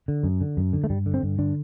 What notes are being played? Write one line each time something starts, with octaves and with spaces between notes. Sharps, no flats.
D3
F#2
D3
F#2
D3
A3
G2 G3
D3
C4
G2
D3 D4